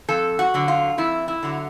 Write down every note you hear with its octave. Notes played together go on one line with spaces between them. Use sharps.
F2 A4
F#4
D3 F#3
F4
F2 E4
E4
D3 F#3